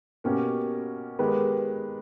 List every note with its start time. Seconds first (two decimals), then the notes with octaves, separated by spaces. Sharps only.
0.24 B2 A#3 C#4 G4 A#4
1.19 D#3 G#3 B3 G4 B4